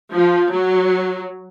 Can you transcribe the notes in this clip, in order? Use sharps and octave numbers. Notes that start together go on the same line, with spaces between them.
F3
F#3